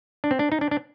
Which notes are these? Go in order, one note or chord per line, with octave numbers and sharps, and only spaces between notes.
D4
C4
D4
D#4
D4
D4